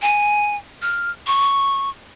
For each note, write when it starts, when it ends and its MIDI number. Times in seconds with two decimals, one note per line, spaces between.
0.02 0.56 80
0.82 1.11 89
1.27 1.90 85